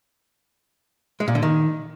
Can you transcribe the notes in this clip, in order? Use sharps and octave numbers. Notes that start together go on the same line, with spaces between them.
G#3
A#2
D3
D#3